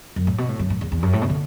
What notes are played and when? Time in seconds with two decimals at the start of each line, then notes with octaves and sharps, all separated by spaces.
0.16 F#2
0.27 A2
0.38 B2
0.49 A2
0.59 F#2
0.70 A2
0.81 E2
0.92 E2
1.03 F#2
1.13 A2
1.21 B2
1.30 D3